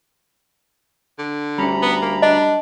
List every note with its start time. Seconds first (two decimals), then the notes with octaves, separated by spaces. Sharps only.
1.19 D3
1.58 D2 G3 C#4 A#5 B5
1.82 B3
2.02 A#3
2.22 D4 D#5